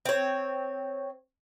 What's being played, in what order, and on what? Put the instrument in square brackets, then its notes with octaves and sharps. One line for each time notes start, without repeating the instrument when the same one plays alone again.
[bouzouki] C4 C#5